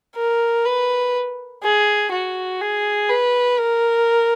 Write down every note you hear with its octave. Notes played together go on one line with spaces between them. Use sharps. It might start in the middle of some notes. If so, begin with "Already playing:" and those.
A#4
B4
G#4
F#4
G#4
B4
A#4